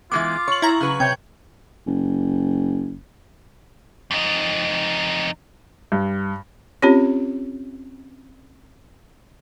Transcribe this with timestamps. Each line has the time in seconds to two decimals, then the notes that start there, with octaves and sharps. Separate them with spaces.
0.12 E3 G#3 B3 F4 D6
0.48 C#5 C#6 F#7
0.62 E4 A#5
0.80 C#3 F#3 B4
1.00 C3 C#5 G5 G6
1.87 F#1
4.11 F2 D#4
5.92 G2
6.82 C4 C#4 F4 G4 C#5